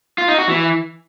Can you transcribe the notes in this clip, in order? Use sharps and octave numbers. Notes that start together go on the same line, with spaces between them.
F4
D#4
F#4
E3